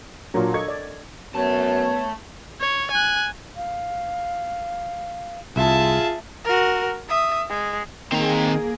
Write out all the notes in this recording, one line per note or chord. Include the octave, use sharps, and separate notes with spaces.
A#2 F#3 D4 A#4 C#5
A4 D#5 C#6 G#6
D5
F#2 A3 B3 C#5 A5
C#5
G#5 F#6
F5
C2 F4 G#4 E5 A5
F#4 A#4
E5 D#6
G#3
D#3 A#3 C4 G#4 A#5